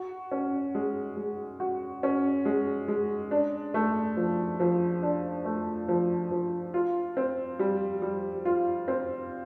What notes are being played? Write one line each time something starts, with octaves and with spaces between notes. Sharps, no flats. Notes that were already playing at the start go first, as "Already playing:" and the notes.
Already playing: F#4
C#4
G#3
G#3
F#4
C#4
G#3
G#3
D4
A3
F3
F3
D4
A3
F3
F3
F4
C4
G3
G3
F4
C4